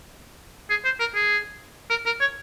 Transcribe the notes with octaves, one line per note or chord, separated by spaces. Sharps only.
G#4
C5
A#4
G#4
A#4
A#4
C#5